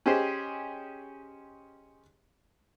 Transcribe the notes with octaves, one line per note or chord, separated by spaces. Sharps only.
C#4 G4 G#4 C5 D#5